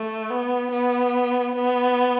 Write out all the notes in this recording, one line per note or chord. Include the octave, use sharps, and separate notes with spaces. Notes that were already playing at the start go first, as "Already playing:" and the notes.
Already playing: A3
B3
B3
B3